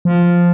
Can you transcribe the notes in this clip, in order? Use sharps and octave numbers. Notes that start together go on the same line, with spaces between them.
F3